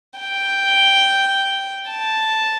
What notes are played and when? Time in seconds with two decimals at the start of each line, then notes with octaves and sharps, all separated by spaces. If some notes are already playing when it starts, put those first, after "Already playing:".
0.20 G5
1.90 A5